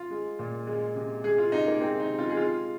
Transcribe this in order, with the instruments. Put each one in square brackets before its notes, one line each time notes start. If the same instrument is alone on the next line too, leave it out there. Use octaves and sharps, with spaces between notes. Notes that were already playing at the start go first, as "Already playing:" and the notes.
Already playing: [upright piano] F4
G#3
A#2
G#3
C3
G#3 G#4
F4
C3 D#4
A#3
G#3 C4
D#4
C3
F4
G#4
G#3 F4